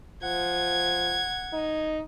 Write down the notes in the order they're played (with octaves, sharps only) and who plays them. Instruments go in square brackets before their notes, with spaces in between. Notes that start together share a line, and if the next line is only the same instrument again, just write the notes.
[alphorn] F3 [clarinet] F#5 [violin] G#6
[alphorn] D#4